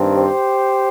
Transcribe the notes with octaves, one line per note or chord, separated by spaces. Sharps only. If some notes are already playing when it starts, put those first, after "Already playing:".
Already playing: G2 D#3 C4
G4 C5